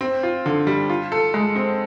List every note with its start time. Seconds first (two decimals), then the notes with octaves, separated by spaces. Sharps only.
0.01 C4
0.23 F4
0.46 D3
0.67 G3
0.90 F4
1.12 A4
1.34 G#3
1.56 C4